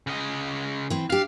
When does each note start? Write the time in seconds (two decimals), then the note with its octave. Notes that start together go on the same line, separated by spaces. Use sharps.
0.07 C#3 D#5
0.90 E3 C4
1.10 D4 G4 F5